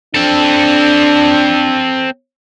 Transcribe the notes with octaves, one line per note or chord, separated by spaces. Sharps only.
C4 D4 A4